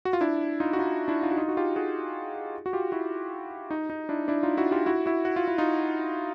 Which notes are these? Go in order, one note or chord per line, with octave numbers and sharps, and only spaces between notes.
F#4
F4
D4 E4
D#4 F4
F#4
D#4 F4
D4 E4
D#4 F4
F#4
D#4 F4
F#4
F4 G4
F#4 G#4
F#4
F4 G4
E4 F#4
D#4
D#4
D4 E4
D4 E4
D#4 F4
E4 F#4
F4 G4
E4 F#4
E4 F#4
F#4
F4
E4
D#4 F4